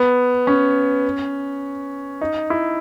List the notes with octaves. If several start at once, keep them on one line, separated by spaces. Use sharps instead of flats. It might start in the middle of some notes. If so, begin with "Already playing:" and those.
Already playing: B3
C#4
D#4
E4